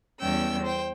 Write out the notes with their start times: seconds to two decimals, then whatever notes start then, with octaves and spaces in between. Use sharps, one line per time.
0.20 E2 G3 B3 C#4 G5 E6
0.63 C5 G5